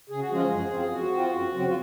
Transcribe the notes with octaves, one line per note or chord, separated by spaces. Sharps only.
C#3 G#4
F#4
F3 G#3 C#4 F4 G#4
F#2
F3 C4 F4
F#2 F#4
F3 C4 F4
F#2
C#3 F#3 C4
F4